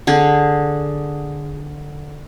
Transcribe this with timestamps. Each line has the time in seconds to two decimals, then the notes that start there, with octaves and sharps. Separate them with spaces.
0.07 D3 G#4